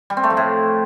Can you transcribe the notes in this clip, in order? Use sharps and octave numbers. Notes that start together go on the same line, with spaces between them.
G3
C4
A3
F3
A2